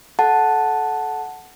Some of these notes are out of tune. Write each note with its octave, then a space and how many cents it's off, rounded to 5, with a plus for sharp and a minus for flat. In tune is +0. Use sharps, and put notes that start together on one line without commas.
A4 -25 F#5 +0 A5 +0